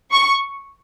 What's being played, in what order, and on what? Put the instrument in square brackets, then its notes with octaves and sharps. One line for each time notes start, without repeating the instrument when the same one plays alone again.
[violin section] C#6